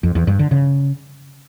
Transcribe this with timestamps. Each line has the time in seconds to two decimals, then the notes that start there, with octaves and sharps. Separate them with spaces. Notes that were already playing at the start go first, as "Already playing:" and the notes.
0.03 F2
0.15 E2
0.27 G2
0.39 D3
0.51 C#3